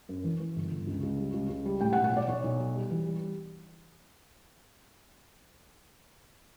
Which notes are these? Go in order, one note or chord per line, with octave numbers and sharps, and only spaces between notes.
F#2
E3
E3
G1
G1
C#2
C#2
G3
C#2
C#2
G3
A2 G5
F#5
B1
F#5
B1
D5
B1 C#5
B1
F#3
G3
E3
G3